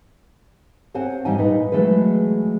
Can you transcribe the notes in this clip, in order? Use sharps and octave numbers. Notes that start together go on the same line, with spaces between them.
C4 C5 C#5 F#5 G#5
G#2 E3 G3 D#4 G5 G#5
A#2 D#4 B4
E3 F#3 G#3 A3 G#4 B4